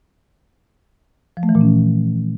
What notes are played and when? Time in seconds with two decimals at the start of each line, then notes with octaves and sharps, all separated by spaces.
1.37 F3
1.43 A3
1.49 E3
1.55 A#2
1.61 C#4